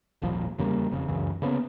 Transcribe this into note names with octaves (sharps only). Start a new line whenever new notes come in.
D#1 G#1 A#2 F3
E2 C#3 G3 A#3
E1 F2 C#3
C#2 F#2 C#3 E3
C#3 A#3 B3 C#4